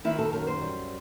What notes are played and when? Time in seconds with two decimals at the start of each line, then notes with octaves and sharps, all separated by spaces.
0.04 D#3 E4
0.19 A4
0.33 F#2 A#4
0.47 C5
0.61 G3